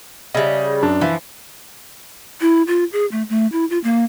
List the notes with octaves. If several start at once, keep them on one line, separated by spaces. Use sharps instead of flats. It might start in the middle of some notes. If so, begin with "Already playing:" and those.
C#3 G3 D#5 E5
F#2 D4 A5
E3 F3 B4 E5
E4
F4
G#4
A3
A3
E4
F4
A#3